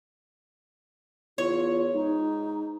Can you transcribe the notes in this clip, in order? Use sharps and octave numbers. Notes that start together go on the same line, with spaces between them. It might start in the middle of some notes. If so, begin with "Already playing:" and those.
E2 F4 C#5
G#2 D#4